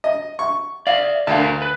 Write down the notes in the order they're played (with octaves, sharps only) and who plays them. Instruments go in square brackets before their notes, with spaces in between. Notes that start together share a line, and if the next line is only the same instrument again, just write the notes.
[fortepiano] D#5
C#6
[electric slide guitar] D5 E5 [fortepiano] F5
[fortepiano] D2 [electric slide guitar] A#4 F5 A5
[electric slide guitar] B4